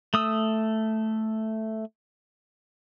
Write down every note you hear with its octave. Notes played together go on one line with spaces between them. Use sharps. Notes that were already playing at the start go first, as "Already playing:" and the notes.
A3 D#6 E6